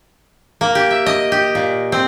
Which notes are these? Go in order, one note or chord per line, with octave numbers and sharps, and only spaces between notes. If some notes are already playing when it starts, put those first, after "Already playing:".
A#3
G4
E5
D#5
G4
A#2
C4